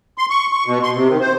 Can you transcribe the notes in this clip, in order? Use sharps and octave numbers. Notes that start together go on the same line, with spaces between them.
C6
C#6
C#6
B2
C6
C3
D#3
C5